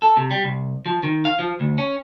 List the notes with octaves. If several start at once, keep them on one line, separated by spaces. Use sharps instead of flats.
A4
C3
G3
C2
F3
D#3
F5
F3
D2
C#4